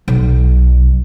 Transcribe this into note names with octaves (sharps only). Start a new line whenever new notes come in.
B1